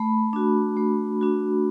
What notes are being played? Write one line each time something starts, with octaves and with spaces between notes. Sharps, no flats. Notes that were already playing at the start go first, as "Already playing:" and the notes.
Already playing: A3 B5
D4 F#4
A3
D4 F#4